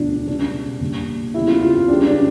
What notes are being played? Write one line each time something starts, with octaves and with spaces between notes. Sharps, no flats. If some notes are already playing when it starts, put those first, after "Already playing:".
Already playing: E1 D2 D3 F3 D4
C#2 C#3 G3 D4
A#1 A#2 G3
E2 C#3 G3 E4
F4
F4
F4
C#2 C#3 G3 D4
D4